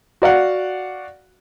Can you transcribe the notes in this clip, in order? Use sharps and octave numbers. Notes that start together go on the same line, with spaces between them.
F#4 D5 F5 F#5